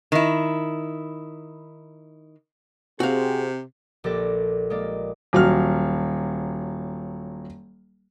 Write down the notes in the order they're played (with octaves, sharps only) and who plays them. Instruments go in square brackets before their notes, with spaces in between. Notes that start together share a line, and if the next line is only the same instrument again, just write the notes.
[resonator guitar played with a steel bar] D#3 E4
[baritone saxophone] C3 [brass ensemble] C4 G#4 [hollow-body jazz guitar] F#4 F5
[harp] A#1 G4 A4 D5 A#6
G#3 A#3 D5
[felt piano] D#1 F#3 F6